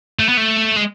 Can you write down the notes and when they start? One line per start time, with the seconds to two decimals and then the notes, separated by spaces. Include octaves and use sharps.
0.19 A3
0.29 B3
0.37 A3
0.76 G#3